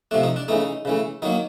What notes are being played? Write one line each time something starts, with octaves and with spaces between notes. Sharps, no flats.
C3 F3 A3 D4
D#4
D4
C#3 E3 A3 D#4
C#3 E3 A3
D#3 F#3 A#3 D#4